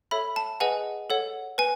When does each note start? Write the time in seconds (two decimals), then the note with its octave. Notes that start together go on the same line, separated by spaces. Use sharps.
0.11 A4 C#5 E5 B5
0.36 A5
0.60 G#4 B4 D#5 F#5 G#5
1.10 A4 C#5 F#5
1.58 B4 G#5